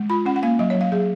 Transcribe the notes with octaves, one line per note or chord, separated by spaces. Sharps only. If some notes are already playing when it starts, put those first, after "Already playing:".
Already playing: G#3
F4 B5
C#4 F#5
F#5
A#3 F5
F#3 D#5
F#3 C#5
F5
F#3 G#4